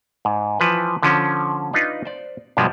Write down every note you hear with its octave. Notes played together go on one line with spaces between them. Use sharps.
G#2
E3 F3 B4
D3 F3 C#4
D4 D#4 F4 B4
C5 D5
G2 B2 F3 G3 G#3